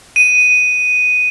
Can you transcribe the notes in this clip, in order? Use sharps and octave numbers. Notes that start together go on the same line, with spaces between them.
D#7